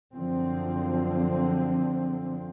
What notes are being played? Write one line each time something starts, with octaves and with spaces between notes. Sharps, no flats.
F#2 D3 F3 C4